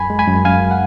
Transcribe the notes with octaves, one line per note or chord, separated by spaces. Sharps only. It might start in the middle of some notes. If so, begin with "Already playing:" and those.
Already playing: F#2 G#5 B5
G#3
G#5 B5
F#2
F#2 F5 G#5
F#5